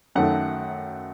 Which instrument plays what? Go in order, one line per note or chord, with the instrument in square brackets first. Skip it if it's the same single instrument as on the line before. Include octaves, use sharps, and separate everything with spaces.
[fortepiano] F#2 D#3 F#3 A3 F#5